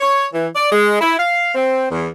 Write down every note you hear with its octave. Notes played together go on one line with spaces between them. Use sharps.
C#5
E3
D5
G#3
E4
F5
C4
E2